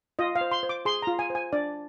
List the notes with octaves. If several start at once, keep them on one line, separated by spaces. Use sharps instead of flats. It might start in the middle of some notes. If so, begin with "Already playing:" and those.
F4 D#5
F5
C5
C6
C5
D6
G#4 C6
F4 A#5
G#5
C5
G#5
D4 D5